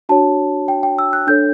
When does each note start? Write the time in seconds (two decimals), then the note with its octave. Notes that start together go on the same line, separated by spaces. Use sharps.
0.09 D4 F#4 C#5 A5
0.68 G5
0.83 G5
0.98 E6
1.13 F#6
1.27 D4 A4 C#5 G6